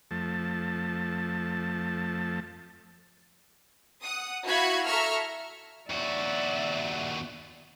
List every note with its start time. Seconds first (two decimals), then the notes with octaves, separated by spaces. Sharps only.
0.11 F2 F3 A3 A5
4.02 F#5 D#6
4.46 E4 F#4 F5 B5 C#6 G#6
4.85 A4 E5 A#5 C#6 E6 F6
5.90 D#2 F#4 D5 E5